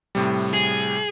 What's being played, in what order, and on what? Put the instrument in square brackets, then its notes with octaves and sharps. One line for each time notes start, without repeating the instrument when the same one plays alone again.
[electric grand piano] A2 C3 G3
[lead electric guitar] G#4